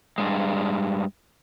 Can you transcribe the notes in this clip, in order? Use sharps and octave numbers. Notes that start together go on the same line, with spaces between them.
G2 G#3